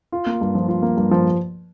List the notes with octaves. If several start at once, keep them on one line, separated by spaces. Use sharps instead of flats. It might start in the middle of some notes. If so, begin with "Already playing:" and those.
F4
A#3
G2
F3
F4
A#3
G2
F3